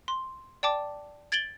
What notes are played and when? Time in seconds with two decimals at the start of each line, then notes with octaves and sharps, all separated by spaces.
0.08 C6
0.63 D5 G5 A5 D6
1.32 G#6 A6 D7 F#7 G7